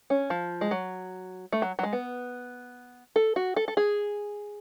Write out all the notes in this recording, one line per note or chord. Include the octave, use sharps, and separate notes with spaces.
C#4
F3
G#3
F#3
A3
F#3
F#3
G#3
B3
A4
F#4
A4
A4
G#4